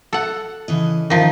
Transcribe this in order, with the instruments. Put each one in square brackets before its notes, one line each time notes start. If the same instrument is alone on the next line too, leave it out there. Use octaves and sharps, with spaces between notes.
[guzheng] A4 F#5
[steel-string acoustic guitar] C#3 E3 D#5
[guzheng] D#3 F3